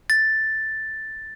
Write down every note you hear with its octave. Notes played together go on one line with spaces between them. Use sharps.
A6